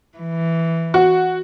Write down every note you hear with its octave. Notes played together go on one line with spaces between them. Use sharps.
E3
F#4